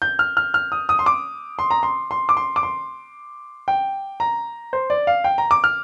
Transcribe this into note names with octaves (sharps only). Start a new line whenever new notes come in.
G6
F6
F6
F6
D#6
D#6
C6
D6
C6
A#5
C6
C6
D6
C6
D6
C6
G5
A#5
C5
D5
F5
G5
A#5
D6
F6